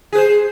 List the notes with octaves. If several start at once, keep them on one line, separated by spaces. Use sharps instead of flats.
G#4 B4 C5